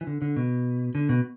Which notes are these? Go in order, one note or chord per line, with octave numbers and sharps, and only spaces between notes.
E3
D3
D3
B2
D3
B2